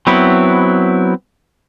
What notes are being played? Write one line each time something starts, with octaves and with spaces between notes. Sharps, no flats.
F#3 B3 C4 E4